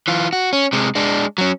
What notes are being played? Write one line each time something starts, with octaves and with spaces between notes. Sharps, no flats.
E3 F4
F#4
C#4
C3 G#3
G#3 D4
F#3 C#4